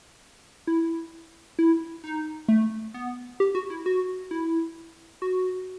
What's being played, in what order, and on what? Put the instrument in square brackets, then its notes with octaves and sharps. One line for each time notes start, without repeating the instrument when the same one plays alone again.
[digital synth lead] E4
E4
D#4
A3
B3
G4
F#4
E4
F#4
E4
F#4